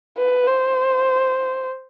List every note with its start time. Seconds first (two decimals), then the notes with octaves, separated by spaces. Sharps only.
0.18 B4
0.47 C5